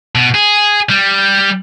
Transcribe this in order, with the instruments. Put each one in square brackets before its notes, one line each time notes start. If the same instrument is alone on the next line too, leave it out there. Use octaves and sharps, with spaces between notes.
[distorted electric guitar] B2
G#4
G3